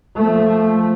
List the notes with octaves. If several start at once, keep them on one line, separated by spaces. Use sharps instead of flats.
F3 A3